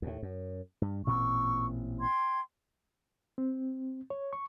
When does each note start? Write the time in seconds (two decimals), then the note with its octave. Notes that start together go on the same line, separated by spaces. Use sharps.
0.02 D#2 A2
0.23 F#2
0.82 G2
1.07 A1 A#2 C4 C#6 E6
2.01 G5 C6 G#6
3.38 C4
4.10 C#5
4.33 C#6